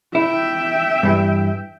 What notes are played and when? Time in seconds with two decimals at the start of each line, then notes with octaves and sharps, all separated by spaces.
0.15 E4 E5 G5
1.03 G2 E3